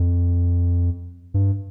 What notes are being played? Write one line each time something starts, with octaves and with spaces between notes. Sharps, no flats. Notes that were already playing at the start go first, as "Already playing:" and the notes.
Already playing: F2
G2